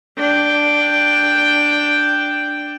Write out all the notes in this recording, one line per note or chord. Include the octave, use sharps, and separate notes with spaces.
D4 G5